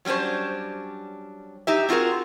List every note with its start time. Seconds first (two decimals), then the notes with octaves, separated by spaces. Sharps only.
0.05 F#3 G3 C#4 D4 C5
1.67 D#4 G4 E5
1.89 C4 F4 F#4 G#4 A#4